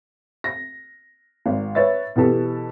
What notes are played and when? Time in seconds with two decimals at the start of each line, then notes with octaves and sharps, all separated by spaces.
0.44 A#6
1.46 G#1
1.75 B4 C#5 E5 A6
2.16 B2 E3 B3 G4 A4